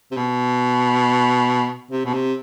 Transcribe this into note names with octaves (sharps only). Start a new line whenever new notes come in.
C3
B2
C3
B2
C3